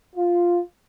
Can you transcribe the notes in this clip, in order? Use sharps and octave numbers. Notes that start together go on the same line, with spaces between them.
F4